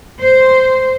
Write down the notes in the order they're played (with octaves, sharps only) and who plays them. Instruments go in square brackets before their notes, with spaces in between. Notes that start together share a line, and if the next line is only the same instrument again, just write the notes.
[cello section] C5